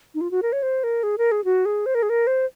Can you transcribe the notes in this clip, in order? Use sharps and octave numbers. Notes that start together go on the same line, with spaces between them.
D#4
F4
F#4
A#4
C#5
C5
A#4
G#4
A#4
G#4
F#4
G#4
C5
A#4
G#4
A#4
C5